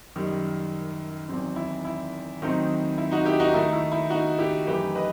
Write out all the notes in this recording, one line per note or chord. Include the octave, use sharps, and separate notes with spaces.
F#2 D#3 G3
E2 D#3 F#3 C4
E4
E4
D#3 F#3 A3 C4 D#4
E4
D#4 F#4
E4 G4
D#4 F#4
D#3 A3 D#4 E4
E4
E4
D#4 F#4
E4 G4
F#2 E3 A3 D#4 G4 B4
B4 D#5